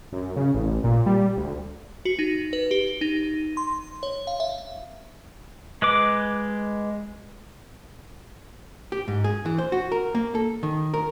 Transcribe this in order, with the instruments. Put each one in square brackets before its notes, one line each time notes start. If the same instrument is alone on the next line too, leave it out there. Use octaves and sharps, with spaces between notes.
[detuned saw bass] F#2
C#3
A1
A#2
G3
D2
[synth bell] F#4
D#4
B4
G4
D#4
C6
C#5
F5
E5
[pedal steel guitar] G#3 B4 D6
[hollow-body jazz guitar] G4
G#2
G#4
E3
C5
F#4
A#4
A#3
A4
D#3
A#4